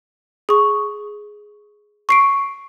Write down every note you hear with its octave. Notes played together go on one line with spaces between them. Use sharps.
G#4 C#6
C#6 C7 D7